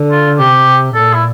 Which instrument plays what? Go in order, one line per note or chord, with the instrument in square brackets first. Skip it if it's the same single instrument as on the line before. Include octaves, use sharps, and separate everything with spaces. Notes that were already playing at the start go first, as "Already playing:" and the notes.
Already playing: [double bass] D3
[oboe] F4
[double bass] C3 [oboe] G4
[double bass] A#2 [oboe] A4
[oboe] E4